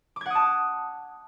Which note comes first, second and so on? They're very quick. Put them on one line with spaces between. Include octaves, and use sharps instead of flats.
D6 G#6 F#5 D#6 A5